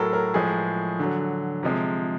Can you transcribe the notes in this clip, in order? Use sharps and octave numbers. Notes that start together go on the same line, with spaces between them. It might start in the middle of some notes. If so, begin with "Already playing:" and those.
Already playing: A2 F#3 A4 A#4
A#4
A2 F3 G#3 G#4
D3 F#3
C3 F3 G#3